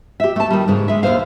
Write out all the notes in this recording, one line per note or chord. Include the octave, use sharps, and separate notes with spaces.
G4 E5
A3 A5
D#3 G3
G#2 C#3
G#3 E5
D#2 C3 C5 F5